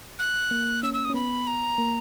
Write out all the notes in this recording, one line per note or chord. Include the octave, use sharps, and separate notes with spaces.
F#6
A#3
C#4 E6
E6
D#6
C#4
B3 B5
A#5
A#3